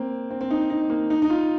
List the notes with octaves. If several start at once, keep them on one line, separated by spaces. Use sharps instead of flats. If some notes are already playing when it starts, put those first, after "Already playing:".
Already playing: A#3 C4
C4
C4
D#4
D#4
A#3
D#4
D#4
F4